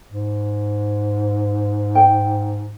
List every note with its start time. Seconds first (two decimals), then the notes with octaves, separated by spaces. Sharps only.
0.11 G#2
1.95 G5